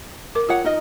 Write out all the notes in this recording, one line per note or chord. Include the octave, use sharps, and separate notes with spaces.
A#4 D6
F4 A#4 C#5 F#5
D#4 A#4 D#5